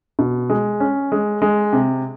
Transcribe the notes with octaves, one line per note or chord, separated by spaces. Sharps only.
B2
G#3
C#4
G#3
G#3
C3